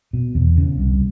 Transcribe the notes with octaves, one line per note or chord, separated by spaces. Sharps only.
B2
E2
C#3
C2